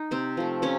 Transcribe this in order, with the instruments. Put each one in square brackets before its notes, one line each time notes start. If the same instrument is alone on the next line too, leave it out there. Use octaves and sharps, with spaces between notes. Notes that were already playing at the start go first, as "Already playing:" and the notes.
Already playing: [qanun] D#4
C3 C4
F3 A3
C3 C#4